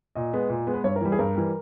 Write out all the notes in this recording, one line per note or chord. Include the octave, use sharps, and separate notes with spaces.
A#2 D#5
G#3 B3
A#2
G#3 B3
B4
G2 C#5
A#4
E3 G3
G#4
G2 A#4
E3 G3